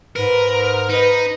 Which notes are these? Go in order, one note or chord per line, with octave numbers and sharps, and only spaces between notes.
G#2 A#4 B4
D#4 B4 D#5